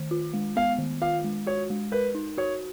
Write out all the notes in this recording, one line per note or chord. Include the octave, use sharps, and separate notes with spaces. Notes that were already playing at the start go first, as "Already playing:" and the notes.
Already playing: D#3
F4
G#3
B3 F5
D#3
F4 F5
G#3
F#4 C#5
G#3
A#4 B4
D#4
F#4 C#5